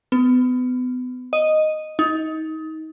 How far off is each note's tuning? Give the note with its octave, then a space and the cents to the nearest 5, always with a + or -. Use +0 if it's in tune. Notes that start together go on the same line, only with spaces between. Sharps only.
B3 +30
D#5 -5
D#4 +25